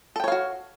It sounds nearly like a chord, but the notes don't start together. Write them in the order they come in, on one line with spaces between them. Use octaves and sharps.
A4 G5 C#5 F5 F#4